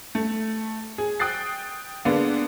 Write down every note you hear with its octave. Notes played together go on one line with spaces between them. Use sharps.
A3
G#4
G5 D#6 F#6 A6 C7
D3 G#3 A#3 B3 D4